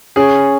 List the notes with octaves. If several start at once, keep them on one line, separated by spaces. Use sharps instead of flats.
C#4 G#4